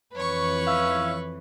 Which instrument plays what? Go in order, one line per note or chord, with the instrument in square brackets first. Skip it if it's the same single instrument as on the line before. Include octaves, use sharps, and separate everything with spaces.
[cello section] F2 E3 [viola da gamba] B4 [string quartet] C#5 C#6
[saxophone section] C#4 E5 F5